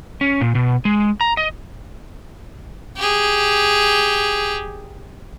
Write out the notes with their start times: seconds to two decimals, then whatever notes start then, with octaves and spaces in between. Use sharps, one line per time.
0.21 C#4
0.41 A#2
0.55 B2
0.85 G#3
1.21 A#5
1.37 D#5
2.97 G4 G#4